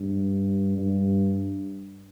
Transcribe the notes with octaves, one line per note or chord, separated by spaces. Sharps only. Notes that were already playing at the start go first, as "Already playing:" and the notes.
Already playing: G2
G2